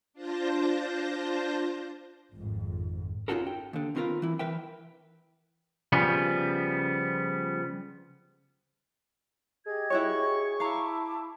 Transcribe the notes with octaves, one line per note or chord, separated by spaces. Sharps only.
D4 F4 C5 A5 G6 A#6
G#1 F2 G#2
C#4 D#4 F4 F#4 A4 A#4
G5
D#2 D3
D#2 D#3 C4 F4 A#4 B4
E3 E4
E3 A#4 B4 E5 G5
C#3 F3 G3 B3
G4 G#4 D#5 G#6
E4 F#4 C#5 C#6
E4 F5 A5 A#5 D6